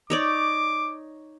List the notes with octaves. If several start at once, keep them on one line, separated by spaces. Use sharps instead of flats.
D#4 C#5 D5 D6